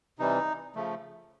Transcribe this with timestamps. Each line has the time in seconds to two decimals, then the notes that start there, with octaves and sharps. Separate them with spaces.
0.19 C3 E3 G3 D#4
0.75 C#3 F3 A3